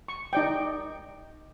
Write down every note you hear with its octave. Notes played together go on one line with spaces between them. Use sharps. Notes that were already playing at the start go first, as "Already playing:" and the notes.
C#6
D#4 D5 G5